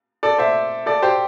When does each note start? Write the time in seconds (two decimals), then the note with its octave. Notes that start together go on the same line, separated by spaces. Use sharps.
0.23 A4 D5
0.38 C5 E5
0.86 A4 D5
1.02 G4 C5